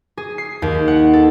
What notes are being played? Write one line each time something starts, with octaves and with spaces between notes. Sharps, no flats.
G#4
C7
D#2
F#5
A4